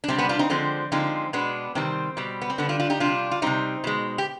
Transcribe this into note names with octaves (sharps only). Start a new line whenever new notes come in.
D4
C3 G3 C4
B3 D4
D4 F4
C4 D#4
D3 F3 G#3 C4
D3 F3 G#3 C4 D#4
B2 G#3 B3 D4
C3 D#3 G3 C4
B2 G3
B3
C4
D3 G3 B3 D4
D4 F4
D4 F4
D#4 G4
C3 G3 D4 F4
F4
C3 G3 C4 D#4
B2 G#3
G4